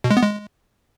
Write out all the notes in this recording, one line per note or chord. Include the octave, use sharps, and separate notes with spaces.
B2
G#3
B3
G#3